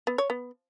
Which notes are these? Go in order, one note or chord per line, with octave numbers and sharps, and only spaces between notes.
B3
C#5
B3